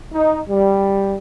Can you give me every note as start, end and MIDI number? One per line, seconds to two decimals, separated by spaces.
0.13 0.37 63
0.47 1.14 55